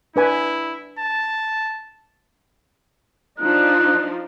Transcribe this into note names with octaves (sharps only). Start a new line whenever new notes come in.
D4 E4 B4 G#5
A5
F3 D4 D#4 F#6